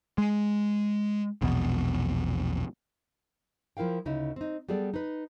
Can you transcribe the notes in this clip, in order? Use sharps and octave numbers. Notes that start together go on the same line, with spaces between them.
G#3
A#1 E2 B2
F3 E4 A#4 F5 G5
D2 C#3 D#4 E4
C4 D#4
G3 B3 G#4 A4 D5
D#4 B4